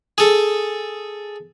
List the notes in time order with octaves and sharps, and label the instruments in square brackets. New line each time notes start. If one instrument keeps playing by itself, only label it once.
[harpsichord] G#4 A4